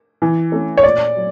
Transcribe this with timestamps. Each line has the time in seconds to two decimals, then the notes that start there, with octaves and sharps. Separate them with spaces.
0.22 E3
0.52 A3 C#4
0.77 C#5
0.83 A#2 D5
1.16 F#3